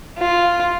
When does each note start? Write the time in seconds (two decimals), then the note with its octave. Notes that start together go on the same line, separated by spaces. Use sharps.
0.18 F4